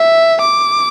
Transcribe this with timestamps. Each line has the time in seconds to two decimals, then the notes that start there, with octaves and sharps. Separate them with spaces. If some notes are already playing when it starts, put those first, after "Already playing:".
Already playing: E5
0.41 D6